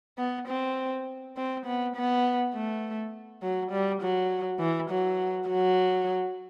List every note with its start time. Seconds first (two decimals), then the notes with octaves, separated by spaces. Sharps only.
0.18 B3
0.48 C4
1.36 C4
1.66 B3
1.96 B3
2.54 A3
3.43 F#3
3.71 G3
4.02 F#3
4.59 E3
4.90 F#3
5.48 F#3